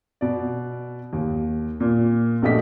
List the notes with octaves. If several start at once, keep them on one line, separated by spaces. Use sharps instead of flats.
B2 D5
D#2
A#2
A#1 B2 A3 G4 D#5 B6